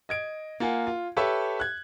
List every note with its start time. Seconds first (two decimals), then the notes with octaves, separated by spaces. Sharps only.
0.09 D#5 G#6 D7
0.60 A#3 F4 F#5 G#5
0.87 F4
1.17 G4 A4 B4 C#5 E5
1.60 F#6 G#6